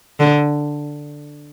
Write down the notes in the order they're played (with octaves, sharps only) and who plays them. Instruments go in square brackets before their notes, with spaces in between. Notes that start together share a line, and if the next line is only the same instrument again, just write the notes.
[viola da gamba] D3